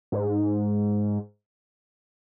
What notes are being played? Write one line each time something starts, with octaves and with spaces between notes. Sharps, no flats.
G#2